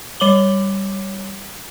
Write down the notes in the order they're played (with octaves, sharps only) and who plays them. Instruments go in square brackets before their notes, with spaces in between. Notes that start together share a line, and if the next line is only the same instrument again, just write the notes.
[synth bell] G3 C#5 D6 F#7 G7